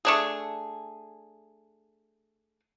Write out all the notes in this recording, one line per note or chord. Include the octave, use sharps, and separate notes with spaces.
A3 D4 G#4